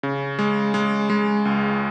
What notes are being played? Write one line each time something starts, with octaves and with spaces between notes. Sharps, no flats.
C#3
G#3
G#3
G#3
C#2